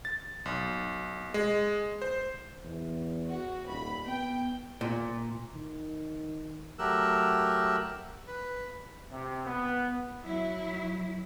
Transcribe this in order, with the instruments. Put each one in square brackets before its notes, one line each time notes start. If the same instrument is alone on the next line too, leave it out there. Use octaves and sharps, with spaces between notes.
[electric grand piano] A6
B1
G#3
C5
[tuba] E2
[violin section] F#4
[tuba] D#1 [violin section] B5
[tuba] B3 [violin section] G5
[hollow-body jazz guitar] A#2
[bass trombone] D#3
[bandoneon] F#3 A3 G4 A#4 E6 F#6
B4
[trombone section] C3
B3
[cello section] F#3 E4